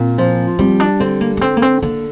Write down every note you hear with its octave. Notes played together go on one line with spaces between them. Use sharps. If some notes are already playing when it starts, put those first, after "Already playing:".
Already playing: A#2 C4
F3
G3 C4
D4
D3 C4
A#3
A#3
D3 C4
A#3
C4
D3 A#3